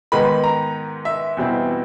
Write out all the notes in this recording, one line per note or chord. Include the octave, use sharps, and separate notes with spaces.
G#2 D#3 G#3 B3 B5
A#5
E5
E2 B2 G3 C4 E4